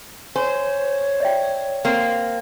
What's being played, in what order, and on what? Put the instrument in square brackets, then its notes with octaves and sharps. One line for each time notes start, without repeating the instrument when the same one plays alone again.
[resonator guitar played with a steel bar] C5 [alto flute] C#5 [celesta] G#5
[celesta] D5 E5 G5
[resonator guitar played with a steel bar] A#3 C4